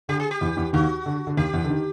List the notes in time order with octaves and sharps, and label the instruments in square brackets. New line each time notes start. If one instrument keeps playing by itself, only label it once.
[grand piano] D3 [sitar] G4
[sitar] G#4
G4
[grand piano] E2 E3
E2 E3
[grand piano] D#2 D#3 [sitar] F#4
[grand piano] D3
D3
[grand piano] D#2 D#3 [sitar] G4
[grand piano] E2 E3
D3
D#3